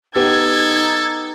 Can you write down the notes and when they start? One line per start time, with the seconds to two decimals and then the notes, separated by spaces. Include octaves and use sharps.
0.16 B3 D#4 G4 A4 G#6